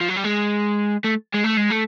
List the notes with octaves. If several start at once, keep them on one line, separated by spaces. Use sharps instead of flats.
F3
F#3
G3
G#3
A3
G#3
A3
G#3
A3